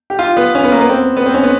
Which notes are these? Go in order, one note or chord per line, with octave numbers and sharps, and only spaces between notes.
G4
F4
B3
C#4
B3
A#3
B3
C4
B3
C4
C#4
B3